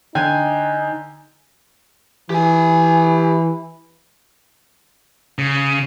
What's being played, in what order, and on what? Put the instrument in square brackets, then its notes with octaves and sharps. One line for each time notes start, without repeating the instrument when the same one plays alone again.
[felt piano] D3 [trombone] D#4 [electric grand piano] G5 [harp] G#5
[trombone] E3 [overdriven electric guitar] G4 G#5
[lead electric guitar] C#3